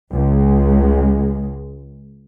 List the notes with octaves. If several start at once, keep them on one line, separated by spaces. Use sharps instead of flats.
C#2 G#3